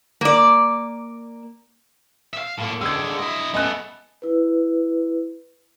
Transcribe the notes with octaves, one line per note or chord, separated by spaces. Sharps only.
A#3 D5
E5 F5
A2 A#3
D3 G#3 E6 G#6
E4 D#5
A3 B3 D#5 G#5 F#6
E4 B4